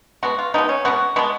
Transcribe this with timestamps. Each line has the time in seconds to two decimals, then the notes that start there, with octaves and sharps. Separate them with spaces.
0.23 B2 G#3 B3 F#4
0.38 F4
0.54 B2 G#3 B3 D#4
0.69 C#4
0.85 B2 G#3 B3 F#4
1.16 B2 G#3 B3